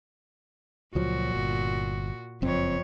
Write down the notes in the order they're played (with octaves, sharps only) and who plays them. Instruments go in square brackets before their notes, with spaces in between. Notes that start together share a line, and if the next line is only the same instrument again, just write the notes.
[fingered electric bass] C#2 F3 F#3 [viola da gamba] A#2 F#4
[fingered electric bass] G1
[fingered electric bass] F#1 C4 [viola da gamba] F2 C#5